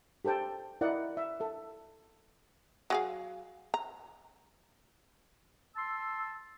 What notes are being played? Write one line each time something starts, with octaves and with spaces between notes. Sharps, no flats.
G4 A4 C5 G5 A5
E4 A#4 D5 D#5 F#5
E5
A4 E5
F#3 G#4 F5
A#5
A5 C6 E6